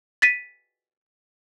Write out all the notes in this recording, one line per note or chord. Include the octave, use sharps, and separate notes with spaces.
A6 B6 D#7